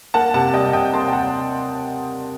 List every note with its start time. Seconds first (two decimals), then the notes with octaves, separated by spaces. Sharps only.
0.14 A#3 F#5 A5
0.34 C3 F#5 A5
0.54 G3 D#5 G5
0.73 C3 D#5 G5
0.93 A#3 A5 C6
1.08 G5
1.13 C3 F#5 A5